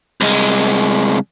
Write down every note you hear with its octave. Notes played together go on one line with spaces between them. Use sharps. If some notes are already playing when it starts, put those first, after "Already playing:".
C2 G#3